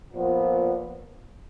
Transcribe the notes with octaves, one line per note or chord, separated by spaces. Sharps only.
A#2 F3 B3